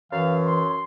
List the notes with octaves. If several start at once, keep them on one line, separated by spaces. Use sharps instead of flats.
F#2 E3 F5
C6